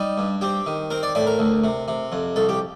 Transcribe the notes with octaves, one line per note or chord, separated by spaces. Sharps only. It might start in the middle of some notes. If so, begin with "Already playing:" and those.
Already playing: G3 D#4
G2
C4 G4
D#3
C4 A#4
D5
A2 D5
A#4
D2
C3
C3
F2
C2 A4
G4